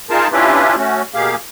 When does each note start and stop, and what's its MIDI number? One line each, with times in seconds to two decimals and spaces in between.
0.10 0.28 63
0.10 0.28 65
0.10 0.28 68
0.10 0.28 70
0.10 0.28 81
0.32 0.76 61
0.32 0.76 62
0.32 0.76 64
0.32 0.76 65
0.32 0.76 67
0.32 0.76 71
0.77 1.02 57
0.77 1.02 61
0.77 1.02 66
1.14 1.35 47
1.14 1.35 58
1.14 1.35 67
1.14 1.35 68
1.14 1.35 77